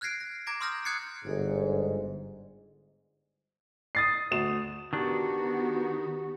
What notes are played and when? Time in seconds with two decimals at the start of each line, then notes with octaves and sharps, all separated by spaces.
0.01 F6 F#6 G#6 A#6 C7 D7
0.20 A#6
0.47 A#5 D6 G#6 A#6 D7
0.61 C6 D#6 F6 G6 A#6
0.85 D#6 F#6 G#6 A6 C7 C#7
1.25 G1 G#2
3.95 D#6 A6 C7
4.32 D2 E7
4.93 D#3 B3 D4 F#4 G4 C#6